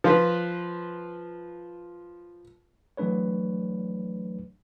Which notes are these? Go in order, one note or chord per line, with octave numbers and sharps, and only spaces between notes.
F3 F4 B4
E3 F#3 A3 D4 B4 C#5